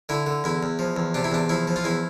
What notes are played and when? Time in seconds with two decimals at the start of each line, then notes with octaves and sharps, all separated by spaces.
0.09 D3 E4
0.27 D3
0.44 E2 E4
0.63 E2
0.79 F3
0.96 E2
1.14 C3 D4
1.24 E4
1.32 E2 D4
1.49 F3 E4
1.68 F3
1.76 F4
1.84 E2 E4